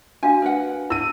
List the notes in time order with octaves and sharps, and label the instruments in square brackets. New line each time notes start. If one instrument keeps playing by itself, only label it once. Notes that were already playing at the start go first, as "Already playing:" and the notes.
[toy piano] D4 F#4 F5 [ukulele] G#5
[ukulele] A#4 B4 F#5
[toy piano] E4 [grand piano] E6 D#7